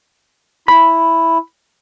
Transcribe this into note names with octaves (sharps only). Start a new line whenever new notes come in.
E4 B5